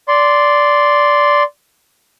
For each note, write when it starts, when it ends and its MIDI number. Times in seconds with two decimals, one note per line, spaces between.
0.08 1.43 74
0.08 1.43 84